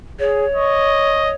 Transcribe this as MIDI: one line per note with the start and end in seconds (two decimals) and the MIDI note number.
0.19 0.45 68
0.19 1.35 73
0.55 1.33 75
0.55 1.23 85